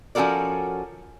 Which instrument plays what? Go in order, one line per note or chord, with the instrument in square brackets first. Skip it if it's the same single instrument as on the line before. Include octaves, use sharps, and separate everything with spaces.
[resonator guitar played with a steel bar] F3 C#4 F#4 A4 A#4 D5